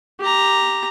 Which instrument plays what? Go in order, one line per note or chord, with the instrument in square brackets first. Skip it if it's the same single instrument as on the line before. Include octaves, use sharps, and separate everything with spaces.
[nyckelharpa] G4 A#5